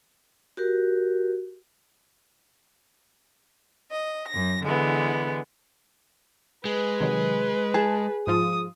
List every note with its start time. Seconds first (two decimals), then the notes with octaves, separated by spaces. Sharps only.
0.57 F#4 G4 A#4
3.91 D#5
4.29 F#2 A#6
4.63 D3 E3 G#3 B3
6.65 G#3 B4
7.00 C3 D#3 F#3
7.74 G#4 A5
8.27 G#2 F3 F4 D#6